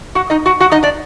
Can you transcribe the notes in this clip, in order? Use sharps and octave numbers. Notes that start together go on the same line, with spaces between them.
F#4 F#5
D#4 D#5
F#4 F#5
F#4 F#5
D#4 D#5
D4 D5